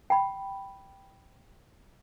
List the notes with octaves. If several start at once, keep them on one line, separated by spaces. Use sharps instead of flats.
G5 B5